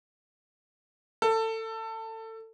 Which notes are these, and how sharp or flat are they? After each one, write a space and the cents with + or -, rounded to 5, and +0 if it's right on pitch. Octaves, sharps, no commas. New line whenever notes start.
A4 +25